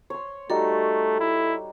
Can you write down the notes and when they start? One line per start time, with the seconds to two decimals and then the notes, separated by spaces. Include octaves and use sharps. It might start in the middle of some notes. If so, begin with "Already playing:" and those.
0.10 C#5 C6
0.50 G3 A3 D#4 F#4 A4
1.20 E4